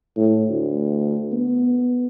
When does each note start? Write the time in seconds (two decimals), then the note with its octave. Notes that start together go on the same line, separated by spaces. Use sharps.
0.17 A2
0.48 D2
1.32 B3